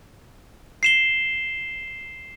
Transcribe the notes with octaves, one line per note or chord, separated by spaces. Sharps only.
C7 E7 G7